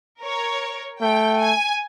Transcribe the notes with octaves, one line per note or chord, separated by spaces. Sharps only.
A#4 C#5
A3 G5
G#5